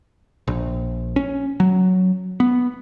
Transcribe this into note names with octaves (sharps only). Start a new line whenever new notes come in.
A#1
C#4
F#3
B3